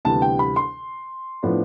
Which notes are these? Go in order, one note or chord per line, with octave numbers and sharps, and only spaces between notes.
D2 C3 E3 G3 B3 A5
G5
B5
C6
A2 F3 B3 D4